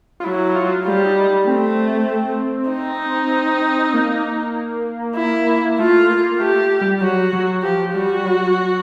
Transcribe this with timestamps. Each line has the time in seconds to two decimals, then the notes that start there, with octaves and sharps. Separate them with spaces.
0.20 F4
0.24 F#3 E4
0.55 F4
0.85 G3 F4
1.06 D#4
1.47 A3 C4
2.70 D#4
3.94 A#3
5.16 E4
5.79 A3 F4
6.09 A#3
6.40 A3 G4
6.81 G3
7.01 F#3 F#4
7.33 F#3
7.63 F3 G4
7.94 G3 F#4
8.25 F#3